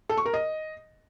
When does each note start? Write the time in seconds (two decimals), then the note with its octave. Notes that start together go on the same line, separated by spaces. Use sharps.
0.09 A4
0.17 C#6
0.26 A#4
0.34 D#5